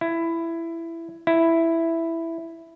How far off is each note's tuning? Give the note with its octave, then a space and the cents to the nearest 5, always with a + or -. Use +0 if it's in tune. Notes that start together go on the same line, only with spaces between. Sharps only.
E4 +15
E4 +5